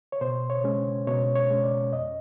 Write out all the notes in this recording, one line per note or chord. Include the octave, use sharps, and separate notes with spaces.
C#5
B2 C5
C#5
G#3 C#4
B2 C#5
C#5
G#3 C#4
D5
F2 D#5